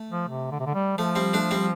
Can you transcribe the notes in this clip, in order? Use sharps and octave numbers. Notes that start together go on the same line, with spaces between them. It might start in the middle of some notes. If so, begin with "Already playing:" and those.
Already playing: A3
F3
C3
D3
C3
D3
G3
F3 A3
G3 C4
A3 D4
G3 C4